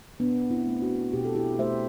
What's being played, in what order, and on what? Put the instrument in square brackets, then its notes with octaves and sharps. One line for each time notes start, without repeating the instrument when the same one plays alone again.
[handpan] B2 B3 D4
C4 E4
A3
D4 F#4
B2 G4
A4
E4 G4
A3 C5 E5